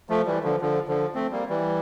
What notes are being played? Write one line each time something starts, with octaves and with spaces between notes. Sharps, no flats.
F3 A3
E3 G3
D3 F3
D3 F3
D3 F3
A3 C4
G3 A#3
E3 G3